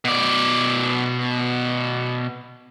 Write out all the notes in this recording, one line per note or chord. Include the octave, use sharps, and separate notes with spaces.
B2 D5